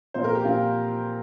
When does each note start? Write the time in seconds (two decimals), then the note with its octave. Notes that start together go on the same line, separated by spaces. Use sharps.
0.14 A#2 F3 C4 C5
0.24 A#4
0.35 G4
0.45 A#2 F3 C4 F4